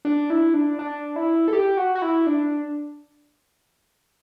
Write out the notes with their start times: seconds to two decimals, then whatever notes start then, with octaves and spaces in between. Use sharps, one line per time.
0.05 D4
0.30 E4
0.54 D4
0.79 D4
1.16 E4
1.48 A4
1.53 G4
1.77 F#4
1.95 F#4
2.02 E4
2.27 D4